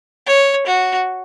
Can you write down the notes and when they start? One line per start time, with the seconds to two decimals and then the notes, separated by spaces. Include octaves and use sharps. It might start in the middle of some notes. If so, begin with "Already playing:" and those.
0.26 C#5
0.67 F#4